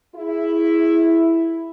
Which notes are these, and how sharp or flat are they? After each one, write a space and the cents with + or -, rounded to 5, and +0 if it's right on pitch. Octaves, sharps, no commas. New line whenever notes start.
E4 +0 G#4 +5